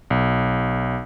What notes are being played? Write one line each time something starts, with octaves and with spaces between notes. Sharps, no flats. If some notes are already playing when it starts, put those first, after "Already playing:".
B1